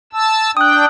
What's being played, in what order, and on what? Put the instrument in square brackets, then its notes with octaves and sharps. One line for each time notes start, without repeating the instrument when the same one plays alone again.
[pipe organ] A5 E6
[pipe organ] D4 G5 [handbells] D#6 F#6